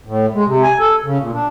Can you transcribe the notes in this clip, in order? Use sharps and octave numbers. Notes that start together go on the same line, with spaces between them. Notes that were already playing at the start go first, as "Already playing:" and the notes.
A2
G#3
C3
G#5
A4
C#3
A#2
D4